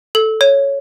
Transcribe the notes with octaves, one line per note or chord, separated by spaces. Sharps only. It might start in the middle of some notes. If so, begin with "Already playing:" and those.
A4
C#5